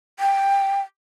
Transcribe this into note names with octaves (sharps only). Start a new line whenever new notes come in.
G5